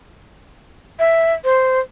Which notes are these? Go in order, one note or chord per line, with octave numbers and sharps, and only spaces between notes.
E5
C5